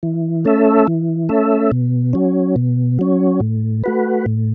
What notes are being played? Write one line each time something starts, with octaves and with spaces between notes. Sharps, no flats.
E3
A3 C#4 A4 E5
E3
A3 C#4 A4 E5
B2
F#3 C#4
B2
F#3 C#4
A2
A3 F#4 B4
A2